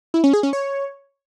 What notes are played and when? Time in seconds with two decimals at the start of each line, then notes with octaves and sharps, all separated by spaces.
0.14 E4
0.24 C#4
0.33 G#4
0.43 C#4
0.53 C#5